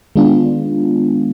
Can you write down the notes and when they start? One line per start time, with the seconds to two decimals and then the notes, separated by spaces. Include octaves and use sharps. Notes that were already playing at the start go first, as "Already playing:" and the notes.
0.16 D#3 G#3 B3 D4 F4